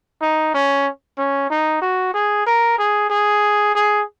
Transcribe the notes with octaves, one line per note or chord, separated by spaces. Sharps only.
D#4
C#4
C#4
D#4
F#4
G#4
A#4
G#4
G#4
G#4